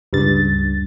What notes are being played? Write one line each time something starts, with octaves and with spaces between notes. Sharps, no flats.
C#2 G2 A6